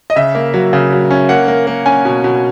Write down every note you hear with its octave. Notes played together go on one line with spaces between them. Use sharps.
D#5
C#3 E5
A#3
F#3
C#3
F#3
C#4
A#3 F#5
A#3
A#3
C#4 G#5
B2
B2